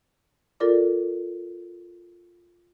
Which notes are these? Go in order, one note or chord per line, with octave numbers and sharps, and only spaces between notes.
F4 A4 A#4 D5 D6